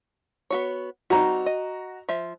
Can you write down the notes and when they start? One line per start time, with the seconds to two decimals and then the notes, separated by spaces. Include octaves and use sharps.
0.50 B3 F#4 C#5
1.10 G3 C4 D#4 F#4 A#5
1.46 D#5
2.09 F3 E5